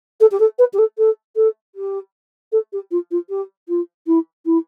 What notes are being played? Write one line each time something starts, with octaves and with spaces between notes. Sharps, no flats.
A4
G4
A4
B4
G4
A4
A4
A4
G4
A4
G4
F4
F4
G4
F4
E4
E4